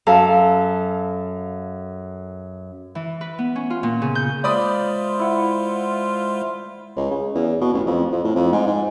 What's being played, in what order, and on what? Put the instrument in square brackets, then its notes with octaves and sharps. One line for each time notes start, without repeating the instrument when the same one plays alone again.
[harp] F#2 A4 F5 A5
E3
B4
B3
C#4
F4
A#2
C#3
G6
[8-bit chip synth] G#3 C5 E5 [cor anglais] F4 [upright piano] D5 B5 D#6
[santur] E4 F#5
[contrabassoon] C#2
C#3
E2
B2
A1
F2
F2
A2
F2
G#2
G#2